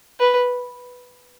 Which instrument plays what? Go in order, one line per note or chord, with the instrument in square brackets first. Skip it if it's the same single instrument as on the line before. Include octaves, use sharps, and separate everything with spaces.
[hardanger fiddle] B4